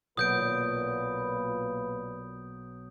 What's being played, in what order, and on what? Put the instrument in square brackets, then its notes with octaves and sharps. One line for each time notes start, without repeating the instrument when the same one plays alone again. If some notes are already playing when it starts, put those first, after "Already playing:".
[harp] B1 [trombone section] A#2 B4 [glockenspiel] D#6 G6 D7